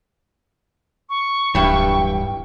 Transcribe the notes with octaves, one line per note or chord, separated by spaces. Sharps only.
C#6
D1 G2 E3 G5